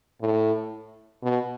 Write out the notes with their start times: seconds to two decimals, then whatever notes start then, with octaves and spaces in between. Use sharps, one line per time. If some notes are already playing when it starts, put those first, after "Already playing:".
0.21 A2
1.22 B2